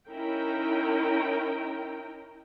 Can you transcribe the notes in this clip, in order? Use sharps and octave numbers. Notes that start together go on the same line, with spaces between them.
C#4 D#4 E4 A#4 G5 A#5